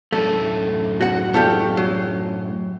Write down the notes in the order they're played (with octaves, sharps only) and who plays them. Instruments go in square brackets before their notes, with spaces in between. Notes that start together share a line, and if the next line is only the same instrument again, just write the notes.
[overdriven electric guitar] F#2 A2 [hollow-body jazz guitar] A3
[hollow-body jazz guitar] F#4 F#5
A3 F4 G4
F#3